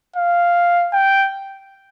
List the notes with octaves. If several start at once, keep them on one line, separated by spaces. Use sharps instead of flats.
F5
G5